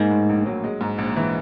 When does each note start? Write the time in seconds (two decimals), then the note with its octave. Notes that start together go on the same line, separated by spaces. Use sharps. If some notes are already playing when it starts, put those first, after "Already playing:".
Already playing: G#2 A#3
0.11 A2
0.29 A#1
0.46 F#3
0.64 G#3
0.81 G#2
0.98 A#1
1.16 E3